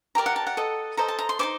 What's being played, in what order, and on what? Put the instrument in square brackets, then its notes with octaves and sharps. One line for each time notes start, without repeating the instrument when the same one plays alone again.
[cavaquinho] G4 A#4 D5 A#5
F#5
A5
F#5
A4 D#5
A4 C5 D#5 A#5
A5
A#5
C6
D#4 A4 C5 D6